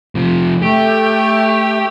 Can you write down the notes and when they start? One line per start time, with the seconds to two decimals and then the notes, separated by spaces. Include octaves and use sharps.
0.15 C3 F3
0.62 A3 G4